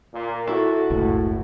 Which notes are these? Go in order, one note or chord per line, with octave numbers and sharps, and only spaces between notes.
A#2
E4 F#4 A4
F#1 C#2 A2